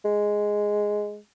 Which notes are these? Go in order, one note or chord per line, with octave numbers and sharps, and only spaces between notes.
G#3